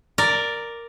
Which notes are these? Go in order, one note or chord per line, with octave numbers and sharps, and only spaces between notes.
A#4 D5